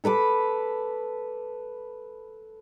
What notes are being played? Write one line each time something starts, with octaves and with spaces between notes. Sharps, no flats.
A4 B4 B5 D6